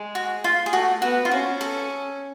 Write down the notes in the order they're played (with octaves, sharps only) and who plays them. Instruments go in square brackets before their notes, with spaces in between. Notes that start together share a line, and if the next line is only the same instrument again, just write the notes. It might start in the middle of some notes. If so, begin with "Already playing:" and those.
Already playing: [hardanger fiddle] G#3
[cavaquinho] F#4
F4
G#4
[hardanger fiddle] A3 [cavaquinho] F#4
[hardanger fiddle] B3 [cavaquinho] F#4
[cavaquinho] F4
[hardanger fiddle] C#4 [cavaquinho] F#4
[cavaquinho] A4